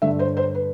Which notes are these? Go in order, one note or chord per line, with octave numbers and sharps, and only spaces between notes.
G2 D3 A3 E5
C5
C5
B4